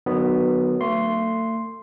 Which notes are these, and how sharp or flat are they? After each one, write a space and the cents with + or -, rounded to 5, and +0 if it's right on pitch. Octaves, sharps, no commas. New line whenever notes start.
D#3 -45 F#3 +0 B3 +0
A3 +40 C6 +0